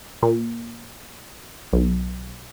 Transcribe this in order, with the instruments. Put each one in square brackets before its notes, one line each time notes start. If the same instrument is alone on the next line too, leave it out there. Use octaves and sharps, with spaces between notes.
[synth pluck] A#2
B1